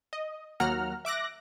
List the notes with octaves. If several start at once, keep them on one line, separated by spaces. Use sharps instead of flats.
D#5
D#2 F#3 A#3 F#5 A#5 F6
E5 D6 F#6 A#6